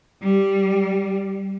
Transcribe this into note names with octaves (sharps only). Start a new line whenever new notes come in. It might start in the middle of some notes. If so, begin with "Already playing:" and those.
G3